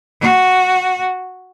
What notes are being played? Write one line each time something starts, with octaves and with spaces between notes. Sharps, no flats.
F#4